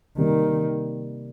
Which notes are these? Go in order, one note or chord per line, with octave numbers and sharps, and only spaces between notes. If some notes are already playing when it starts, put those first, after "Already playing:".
C3 D#3 G3 A#3